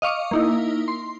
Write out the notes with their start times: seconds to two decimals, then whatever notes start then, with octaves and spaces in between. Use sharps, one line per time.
0.02 D#5 F5 C#6 D6
0.31 A#3 D#4 E4
0.88 C6